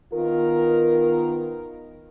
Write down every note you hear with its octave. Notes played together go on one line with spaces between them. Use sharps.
D#3 B3 F4 A#4